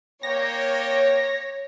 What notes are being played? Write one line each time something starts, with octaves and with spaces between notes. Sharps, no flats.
A#3 C#5 D5 G5 A#6